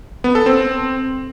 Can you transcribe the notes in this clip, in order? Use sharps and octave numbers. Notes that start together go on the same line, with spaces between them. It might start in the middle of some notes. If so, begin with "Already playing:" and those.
B3
A4
C4